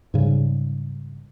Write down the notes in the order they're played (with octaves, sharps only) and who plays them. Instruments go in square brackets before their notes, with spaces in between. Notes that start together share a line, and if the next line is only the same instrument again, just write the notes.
[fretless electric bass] G#2 C#3 G3